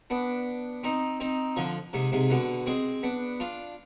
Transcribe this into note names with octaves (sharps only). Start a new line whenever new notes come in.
B3 D4
C4 D#4
C4 D#4
D3 F3
G#2 C3
G#2 C3
B2 D3
G#3 C4
B3 D4
D4 F4